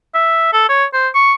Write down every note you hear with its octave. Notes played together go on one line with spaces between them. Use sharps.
E5
A4
C#5
C5
C#6